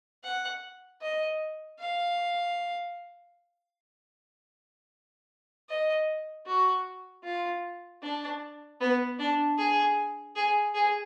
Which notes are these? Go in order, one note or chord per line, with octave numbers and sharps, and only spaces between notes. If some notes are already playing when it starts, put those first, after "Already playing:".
F#5
D#5
F5
D#5
F#4
F4
D4
B3
D4
G#4
G#4
G#4